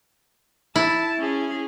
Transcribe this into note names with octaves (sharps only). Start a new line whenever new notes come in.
E4 A5
C#4 G#4